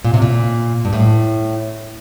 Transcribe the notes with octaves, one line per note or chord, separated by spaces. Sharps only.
A#2
C3
A#2
G2
A2